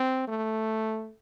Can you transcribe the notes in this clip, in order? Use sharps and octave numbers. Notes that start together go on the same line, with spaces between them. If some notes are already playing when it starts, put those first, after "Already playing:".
Already playing: C4
A3